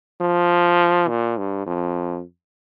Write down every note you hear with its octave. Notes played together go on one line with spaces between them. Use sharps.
F3
A#2
G2
F2